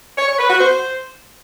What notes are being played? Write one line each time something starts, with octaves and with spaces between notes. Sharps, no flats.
C#5
C#5
B4
F#4
C5